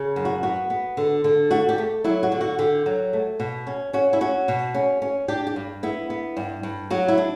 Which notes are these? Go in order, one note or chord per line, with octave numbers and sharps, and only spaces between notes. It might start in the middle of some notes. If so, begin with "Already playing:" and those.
Already playing: C#3
F#2
F#4
B3 F#4
B3
D3
D3
A3 F#4
G4
A3
F#3 E4
F#4
D3
F#4
D3 G4
F#3
A3
B2
C#4
C#4 F#4
E4
C#4 F#4
B2
C#4
C#4
D4 G4
G4
G2
B3 E4
B3
G2
G2
F#3 F#4
E4
D4